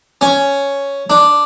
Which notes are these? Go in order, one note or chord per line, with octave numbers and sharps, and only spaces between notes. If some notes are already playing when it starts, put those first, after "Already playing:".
C#4
D4